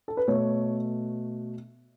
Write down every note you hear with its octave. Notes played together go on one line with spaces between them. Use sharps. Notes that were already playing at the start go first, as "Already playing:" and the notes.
A4
B4
B2 A3 C#5